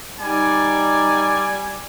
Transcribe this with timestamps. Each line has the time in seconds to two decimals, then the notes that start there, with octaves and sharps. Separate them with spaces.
0.20 G3 D#4 D5 G#5